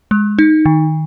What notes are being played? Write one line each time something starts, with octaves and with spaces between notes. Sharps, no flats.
G#3
D#4
D#3